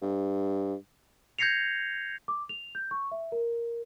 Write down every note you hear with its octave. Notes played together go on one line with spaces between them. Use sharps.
G2
G6 G#6 A#6 C7 C#7 F7
D6
F7
G6
C#6
E5
A#4